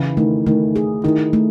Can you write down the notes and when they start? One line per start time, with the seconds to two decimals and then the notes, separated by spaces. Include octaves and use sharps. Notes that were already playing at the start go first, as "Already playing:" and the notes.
Already playing: C#3 E3 E4
0.17 D#3 A3
0.47 D#3 A3
0.76 G#4
1.04 D#3 E4
1.33 A3